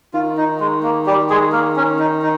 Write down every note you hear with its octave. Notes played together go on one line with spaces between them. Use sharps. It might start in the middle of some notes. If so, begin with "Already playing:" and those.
D#3 F4
D#4
G#3
A#3
G3 G4
G#3 G#4
A#3 A#4
C#4
D#4
D#4